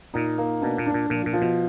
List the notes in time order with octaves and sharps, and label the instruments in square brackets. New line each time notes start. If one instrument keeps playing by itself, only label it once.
[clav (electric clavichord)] A#2 [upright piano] D#4
[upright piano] A#3
[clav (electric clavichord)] B2 [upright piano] D4
[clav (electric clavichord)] A#2
[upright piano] D4
[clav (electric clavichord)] A#2
[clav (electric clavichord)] A#2 [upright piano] F3
[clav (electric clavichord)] A#2
[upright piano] F3
[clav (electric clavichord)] B2